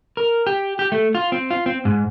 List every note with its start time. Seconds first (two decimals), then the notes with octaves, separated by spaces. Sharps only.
0.17 A#4
0.47 G4
0.79 G4
0.92 A3
1.15 F4
1.32 C4
1.50 F4
1.66 C4
1.85 G#2